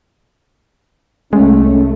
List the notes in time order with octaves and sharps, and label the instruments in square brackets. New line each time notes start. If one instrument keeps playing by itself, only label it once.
[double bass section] C2 A3 [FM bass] G#3 [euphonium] C#4